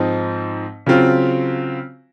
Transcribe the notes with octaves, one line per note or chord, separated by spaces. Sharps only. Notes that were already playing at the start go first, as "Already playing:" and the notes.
Already playing: G#2 F3 C4 D#4
C#3 F#3 C4 F4